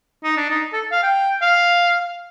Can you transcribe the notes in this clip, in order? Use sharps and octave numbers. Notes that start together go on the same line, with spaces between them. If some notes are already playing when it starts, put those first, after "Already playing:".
D#4
D4
D#4
A4
F5
G5
F5